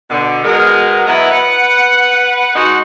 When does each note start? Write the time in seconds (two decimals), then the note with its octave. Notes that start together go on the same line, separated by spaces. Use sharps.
0.10 B2 D3
0.43 B2 G#3 B3 A#4
1.07 F#3 B3 E4 B4 D#5
1.31 B4 F#5
2.55 G#3 D#4 F#4